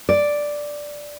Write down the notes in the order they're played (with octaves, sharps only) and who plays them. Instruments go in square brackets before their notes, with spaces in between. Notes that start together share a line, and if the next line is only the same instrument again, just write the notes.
[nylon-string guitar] D5